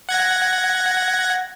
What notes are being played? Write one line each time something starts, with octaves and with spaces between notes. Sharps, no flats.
F#5 G#6 A#6